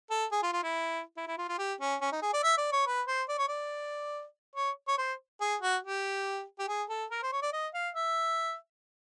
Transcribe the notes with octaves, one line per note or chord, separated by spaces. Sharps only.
A4
G#4
F4
F4
E4
E4
E4
F4
F4
G4
C#4
C#4
D#4
G#4
D5
E5
D5
C#5
B4
C5
D5
C#5
D5
C#5
C#5
C5
G#4
F#4
G4
G4
G#4
A4
A#4
C5
C#5
D5
D#5
F5
E5